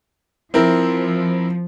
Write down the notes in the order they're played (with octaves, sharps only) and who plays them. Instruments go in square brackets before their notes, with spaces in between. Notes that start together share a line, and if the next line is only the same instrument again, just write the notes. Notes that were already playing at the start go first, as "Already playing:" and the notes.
[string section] F3 [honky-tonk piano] C4 E4 A#4